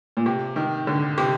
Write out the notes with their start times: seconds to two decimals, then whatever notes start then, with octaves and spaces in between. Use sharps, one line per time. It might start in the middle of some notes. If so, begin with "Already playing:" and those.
0.17 A#2
0.26 C3
0.56 D#3
0.87 D3
1.18 C3